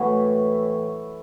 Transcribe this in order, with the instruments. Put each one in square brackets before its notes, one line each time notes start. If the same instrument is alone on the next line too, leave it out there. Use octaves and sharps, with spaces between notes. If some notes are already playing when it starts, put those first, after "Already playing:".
Already playing: [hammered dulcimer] A2 E3 F#3 A3 E4 F#4